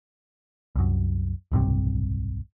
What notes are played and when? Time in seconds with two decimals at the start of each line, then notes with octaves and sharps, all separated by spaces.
0.76 C2 F#2
1.52 D1 B1 G2 C3